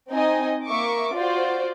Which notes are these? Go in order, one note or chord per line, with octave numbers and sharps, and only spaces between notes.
C4 D#4 D#5 G#5
A#3 E5 C#6 D6
F4 F#4 C5 D5